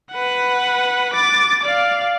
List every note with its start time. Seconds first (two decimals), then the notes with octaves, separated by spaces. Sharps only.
0.12 B4 F#5
1.13 D6 A6
1.63 D5 F5